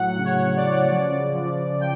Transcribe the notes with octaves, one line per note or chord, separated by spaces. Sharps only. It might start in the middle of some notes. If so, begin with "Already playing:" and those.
Already playing: A2 F#3 F#5
C#3
C#5
F#3
D5
C#3
F3 D5
C#3
F3
C#3
F3 G5